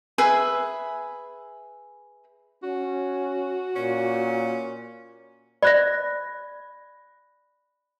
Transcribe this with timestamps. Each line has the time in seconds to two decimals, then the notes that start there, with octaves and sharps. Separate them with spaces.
0.18 G#4 B4 E5 G#5
2.63 C#4 F#4
3.76 A#2 C#4
5.62 D5 B5 F#6 A#6